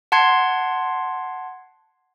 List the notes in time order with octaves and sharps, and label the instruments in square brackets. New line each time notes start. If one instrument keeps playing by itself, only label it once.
[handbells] F#5 A5 C6 G#6 C7